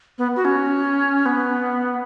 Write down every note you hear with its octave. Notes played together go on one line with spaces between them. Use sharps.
B3
F#4
C#4
B3